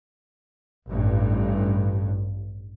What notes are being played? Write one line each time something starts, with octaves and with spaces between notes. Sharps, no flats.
A1 G2